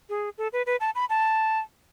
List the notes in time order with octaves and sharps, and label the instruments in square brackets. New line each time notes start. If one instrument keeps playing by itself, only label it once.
[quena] G#4
A4
B4
B4
A5
B5
A5